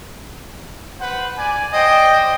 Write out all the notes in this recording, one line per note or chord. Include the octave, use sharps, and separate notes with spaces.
B4 C5 F#5
D5 G#5
C5 D5 D#5 G5